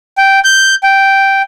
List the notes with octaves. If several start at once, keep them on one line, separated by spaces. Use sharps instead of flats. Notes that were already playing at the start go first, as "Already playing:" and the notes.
G5
G6
G5